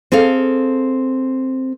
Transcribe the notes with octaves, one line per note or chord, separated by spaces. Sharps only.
C4 G#4 A4 F5